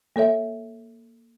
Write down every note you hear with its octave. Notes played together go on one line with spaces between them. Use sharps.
A#3 A4 C#5 E5